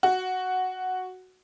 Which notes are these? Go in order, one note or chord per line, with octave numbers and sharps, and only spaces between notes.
F#4